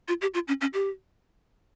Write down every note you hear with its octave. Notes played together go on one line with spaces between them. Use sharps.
F4
G4
F4
C#4
C#4
G4